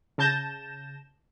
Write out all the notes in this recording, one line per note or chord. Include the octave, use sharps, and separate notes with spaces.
C#3 A5 G6 A#6 E7